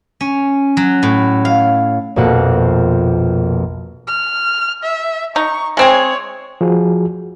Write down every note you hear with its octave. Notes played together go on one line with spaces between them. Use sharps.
C#4
F#3
A2
F5
A#1 F2 B2 A#3 F#5
F6
E5
D#4 C#6
G#3 C4 G#4 C#5
F3 F#4 G#4